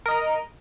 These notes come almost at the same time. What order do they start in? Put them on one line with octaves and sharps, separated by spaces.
A#4 D#5 A#5